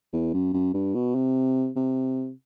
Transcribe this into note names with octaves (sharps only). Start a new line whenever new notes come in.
E2
F#2
F#2
G2
B2
C3
C3